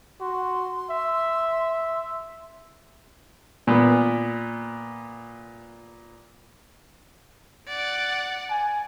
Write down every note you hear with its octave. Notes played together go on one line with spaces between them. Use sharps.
F#4 C6
E5
A#2 B3
D5 F#5
G#5